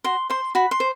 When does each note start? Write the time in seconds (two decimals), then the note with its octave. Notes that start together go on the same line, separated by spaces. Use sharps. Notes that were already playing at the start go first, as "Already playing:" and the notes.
0.04 F#4 C6
0.30 C5 C6
0.55 F#4 B5
0.71 C6
0.80 C5